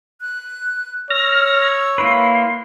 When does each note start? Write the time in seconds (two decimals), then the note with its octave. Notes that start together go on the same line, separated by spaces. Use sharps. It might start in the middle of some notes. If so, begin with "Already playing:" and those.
0.21 F#6
1.10 C#5 E6 F6 A#6
1.98 A#3 E4 B4 C6